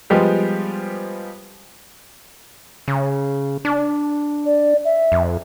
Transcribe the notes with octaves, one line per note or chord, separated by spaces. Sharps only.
F3 G3 G#3 B3 G4 C5
C#3
D4
D5
E5
F2